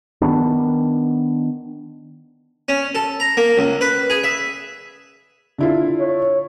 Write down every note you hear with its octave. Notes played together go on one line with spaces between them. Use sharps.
D#3 E3 B3 D4
C#4
A4
A#5
A#3
C#2
B4
G#4
E5
D3 E4 F4
C#5